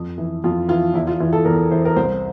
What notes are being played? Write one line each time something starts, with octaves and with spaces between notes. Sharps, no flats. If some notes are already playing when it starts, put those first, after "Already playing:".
Already playing: F2
E3
F2 F4
E3 F4
E2 E4
F4
E3 F4
A4
E2 A#4
E3 C5
A#4
C2 C5